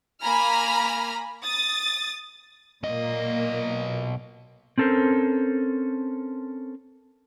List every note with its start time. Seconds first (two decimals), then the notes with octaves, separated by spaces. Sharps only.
0.22 A#3 G#5 A#5 B5 F6
1.44 D#6 A6
2.83 B1 A#2 A#3 D#5
4.78 C4 C#4 A4 A#4 C5